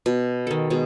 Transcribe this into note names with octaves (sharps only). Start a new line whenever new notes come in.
B2
D#3 A4
B2 G#3